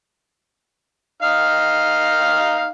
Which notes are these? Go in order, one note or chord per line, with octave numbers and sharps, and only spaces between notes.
D#4 F5 F6